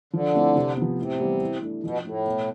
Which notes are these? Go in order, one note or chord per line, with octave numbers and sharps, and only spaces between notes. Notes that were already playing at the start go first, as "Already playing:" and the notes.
D3 F3
A3 C4 E4
C3
F3 B3
A2 C3
E3 G3 B3 E4
E3
A3 D4
B2 F3
A2 A3 E4 A4
B2